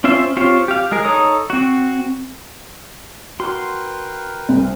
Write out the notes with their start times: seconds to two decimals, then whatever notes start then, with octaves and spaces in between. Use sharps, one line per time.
0.04 C4 C#4 F4 C5 E5
0.37 C4 F4 G4 C5 C#5
0.68 G4 F5
0.91 G#3 G#4 A#4
1.05 D#4 A4 C#5 A#5 D#6
1.50 C4 F#4
3.40 F#4 A#4 B4 G5 C6
4.49 C2 C4